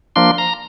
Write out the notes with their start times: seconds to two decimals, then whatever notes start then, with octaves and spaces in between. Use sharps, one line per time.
0.16 F3 A#3 D4 C6
0.38 A#5